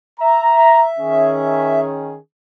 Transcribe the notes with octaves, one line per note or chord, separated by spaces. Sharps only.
E5 A#5
D#3 C#4 G#4